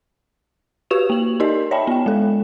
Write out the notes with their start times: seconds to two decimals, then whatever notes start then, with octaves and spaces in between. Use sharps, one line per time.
0.90 F#4 G4 B4 C#6 E7 F7
1.10 A#3 F#7
1.40 D#4 G4 A#4 D5 D#5
1.71 C#5 D5 E5 G5 A5 B5
1.87 B3 G5
2.06 G#3 A4